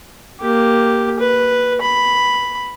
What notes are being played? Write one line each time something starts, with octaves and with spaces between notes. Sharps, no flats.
A#3 G4
B4
B5